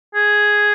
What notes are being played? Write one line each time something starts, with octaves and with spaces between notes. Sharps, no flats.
G#4